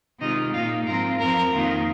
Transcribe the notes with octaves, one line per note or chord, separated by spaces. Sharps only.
C3 D#3 G#3 D#4 F4 D#5
A#2 A#3 D#4 F4 F5
G#2 F3 C4 F4 A#4 A#5
F2 F3 C4 A#4 A#5
F2 D#3 A#3 F4